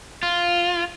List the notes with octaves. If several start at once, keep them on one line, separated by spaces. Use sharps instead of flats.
F4